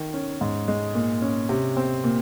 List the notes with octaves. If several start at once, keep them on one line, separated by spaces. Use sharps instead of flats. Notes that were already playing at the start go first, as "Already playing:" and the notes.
Already playing: D#3
C#4
G#2
G#3
A#2
C#4
C3
C4
A#2